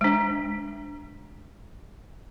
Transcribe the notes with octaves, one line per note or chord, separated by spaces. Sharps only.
G#3 D4